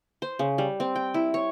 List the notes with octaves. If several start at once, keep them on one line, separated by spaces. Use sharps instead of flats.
C5
C#3
G3
C4
G5
E4
C#5